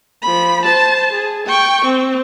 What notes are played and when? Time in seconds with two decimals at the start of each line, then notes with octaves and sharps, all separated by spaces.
0.22 F3 B5
0.66 C5 A5
1.13 G#4
1.47 G5 C#6
1.85 C4